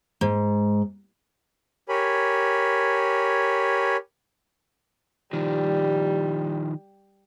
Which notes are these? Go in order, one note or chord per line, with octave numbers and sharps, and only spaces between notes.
G#2
G4 A#4 C#5 G#5 B5
D#3 F3 G3